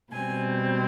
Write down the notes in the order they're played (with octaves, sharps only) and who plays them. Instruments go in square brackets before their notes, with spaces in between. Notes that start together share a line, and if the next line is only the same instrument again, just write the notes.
[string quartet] B2 G3 C4 G#5